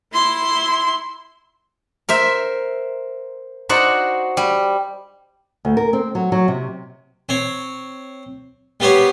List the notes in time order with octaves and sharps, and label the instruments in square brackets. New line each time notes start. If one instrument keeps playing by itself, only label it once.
[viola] E4 C6
[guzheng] A#4 C5 E5
D#4 F#4 C5 D5 F#5
G3
[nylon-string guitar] D2
A#4
C4
F#3
F#3
C3
[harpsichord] C4 C#5
G3 B3 G4 C5 C#5